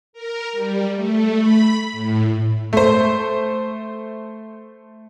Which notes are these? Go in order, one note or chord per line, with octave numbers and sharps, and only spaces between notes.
A#4
G3
A3
B5
A2
A3 C5